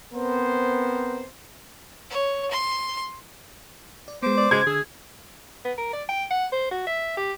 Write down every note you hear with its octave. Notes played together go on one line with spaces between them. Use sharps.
B3 C4 A#4 C5
C#5
C6
D5
G#3 B3 C5 D6
D5
C#3 G#3 G#6
D3 G#4 E6
B3
A#4
D5
G5
F#5
C5
F#4
E5
G4